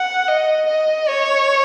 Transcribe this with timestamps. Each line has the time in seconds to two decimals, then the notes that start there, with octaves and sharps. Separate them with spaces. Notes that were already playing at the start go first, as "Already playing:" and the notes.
Already playing: F#5
0.28 D#5
0.68 D#5
1.08 C#5